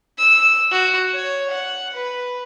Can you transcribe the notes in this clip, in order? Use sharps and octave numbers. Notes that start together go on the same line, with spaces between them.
E6
F#4
C#5
F#5
B4